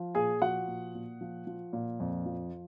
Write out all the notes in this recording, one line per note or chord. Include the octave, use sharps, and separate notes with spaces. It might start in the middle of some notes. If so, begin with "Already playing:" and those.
Already playing: F3
A#2 G#4 G#5
F3 F#4 F#5
A#2
A#2
F3
F3
A#2
F2
F3